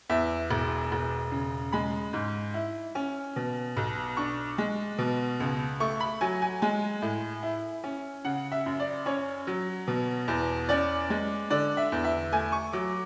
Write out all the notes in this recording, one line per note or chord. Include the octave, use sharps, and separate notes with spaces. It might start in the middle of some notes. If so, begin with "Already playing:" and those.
E2 E5
E1
E1
C#3
G#3 B5
G#2
E4
C#4
B2
B1
D4 C#6
G#3
B2
C#2
A3 C#6
B5
F#3 G#5
G#5
G#3 G#5
A2
E4
C#4
C#3 F#5
E5
F#2
D5
C#4 C#5
F#3
B2
E2
C#4 D5
G#3
D3 D5
E5
E2
E5
A3 G#5
C#6
F#3 D6